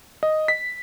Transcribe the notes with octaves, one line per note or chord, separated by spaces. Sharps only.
D#5
B6